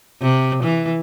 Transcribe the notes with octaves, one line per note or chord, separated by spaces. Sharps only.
C3
E3